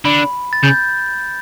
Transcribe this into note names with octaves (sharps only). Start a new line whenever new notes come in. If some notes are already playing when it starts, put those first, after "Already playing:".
D3 B5
A6
C#3 G6